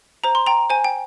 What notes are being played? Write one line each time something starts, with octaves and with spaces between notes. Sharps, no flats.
C5 A#5
C6
G5 A#5
C5 G#5
G5